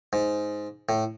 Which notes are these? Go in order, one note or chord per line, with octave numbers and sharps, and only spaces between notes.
G#2
A2